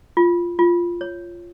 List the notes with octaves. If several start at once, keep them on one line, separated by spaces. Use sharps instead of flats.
F4
F4
C#5